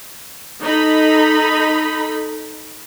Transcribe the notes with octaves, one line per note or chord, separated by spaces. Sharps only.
D#4 A4 B5